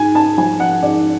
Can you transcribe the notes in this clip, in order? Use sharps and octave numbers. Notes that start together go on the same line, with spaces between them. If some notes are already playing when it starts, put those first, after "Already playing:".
Already playing: G#2 G#5
A5
F3 G#5
F#5
G#2 D5